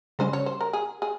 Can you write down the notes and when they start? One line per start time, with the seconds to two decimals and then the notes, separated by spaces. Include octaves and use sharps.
0.19 C#3 G3 C#4 C5
0.33 C#5
0.46 C5
0.61 A#4
0.73 G#4
1.02 G#4